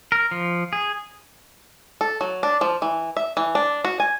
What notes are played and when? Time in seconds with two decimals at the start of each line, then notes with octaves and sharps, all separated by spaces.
0.12 A#4
0.31 F3
0.73 G#4
2.01 A4
2.21 F#3
2.43 D4
2.61 F3
2.82 E3
3.17 E5
3.37 E3
3.55 D4
3.85 F#4
4.00 G#5